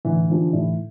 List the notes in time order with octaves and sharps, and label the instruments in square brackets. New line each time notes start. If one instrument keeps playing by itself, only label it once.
[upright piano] A2 [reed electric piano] D3 E3
[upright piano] F3 A#3 D4 G4
A2